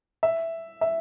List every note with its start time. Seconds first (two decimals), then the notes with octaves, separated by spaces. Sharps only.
0.23 E5
0.81 E5